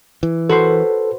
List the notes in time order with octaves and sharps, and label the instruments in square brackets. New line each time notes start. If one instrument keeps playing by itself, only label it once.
[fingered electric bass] E3
[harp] F#4 B4 C5 [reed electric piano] A4